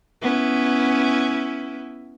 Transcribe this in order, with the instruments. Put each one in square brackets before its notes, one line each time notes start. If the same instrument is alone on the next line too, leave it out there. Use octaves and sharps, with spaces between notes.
[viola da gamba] B3 C#4 E4